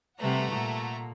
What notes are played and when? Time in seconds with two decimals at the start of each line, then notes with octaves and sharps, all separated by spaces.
0.20 C3 G3 A3 B4 F#5 A#5
0.52 A#2